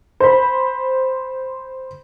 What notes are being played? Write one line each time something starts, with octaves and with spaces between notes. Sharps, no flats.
C5 B5